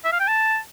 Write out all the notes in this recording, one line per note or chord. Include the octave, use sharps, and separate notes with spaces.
E5
F5
G5
A5